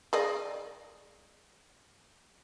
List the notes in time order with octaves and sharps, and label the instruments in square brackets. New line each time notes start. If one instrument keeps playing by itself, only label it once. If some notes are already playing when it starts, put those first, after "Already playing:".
[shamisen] G#4 D5 D#5